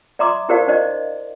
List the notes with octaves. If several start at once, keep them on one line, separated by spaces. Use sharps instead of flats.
D5 E5 A#5 C6 D6 D#6
E4 G4 A#4 C5 D5 F5
D4 C5 D5 D#5